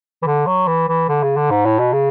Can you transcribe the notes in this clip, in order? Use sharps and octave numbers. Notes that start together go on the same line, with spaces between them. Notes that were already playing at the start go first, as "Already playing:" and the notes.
E3
D3
F#3
E3
E3
D3
C#3
D3
G#2
A2
B2
C#3